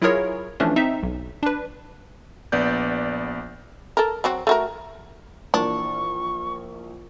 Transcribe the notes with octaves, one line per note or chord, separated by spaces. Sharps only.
F#3 E4 F4 G#4 A#4 C#5
E3 F3 A3 C#4 D4
C4 D#4 E5
B1
D4 B4
A#1 B3 D5 G6
A4 A#4
F#3 C4 F#4
A3 F#4 A#4
A#1 E3 D4 A#4 C#6